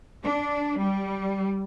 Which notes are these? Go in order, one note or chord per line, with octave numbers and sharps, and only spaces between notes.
D4
G3